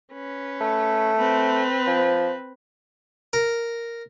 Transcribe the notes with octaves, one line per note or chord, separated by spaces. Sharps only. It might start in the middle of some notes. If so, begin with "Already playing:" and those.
C#4 B4
A3
C4 B4
F3
A#4